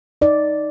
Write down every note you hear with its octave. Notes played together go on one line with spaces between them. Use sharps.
D#4 D5